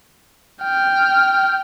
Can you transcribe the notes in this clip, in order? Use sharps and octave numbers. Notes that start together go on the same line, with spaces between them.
G5 F6